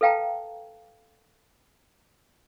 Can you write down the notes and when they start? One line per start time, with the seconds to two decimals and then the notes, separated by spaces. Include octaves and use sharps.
0.01 A4 B4 F5 G5 A5 A#5